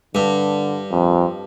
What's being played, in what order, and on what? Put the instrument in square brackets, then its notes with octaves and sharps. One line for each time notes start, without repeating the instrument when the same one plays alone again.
[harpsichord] G2 [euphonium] D3
[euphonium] F2